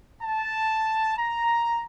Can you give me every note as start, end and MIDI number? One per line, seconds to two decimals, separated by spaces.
0.22 1.16 81
1.16 1.82 82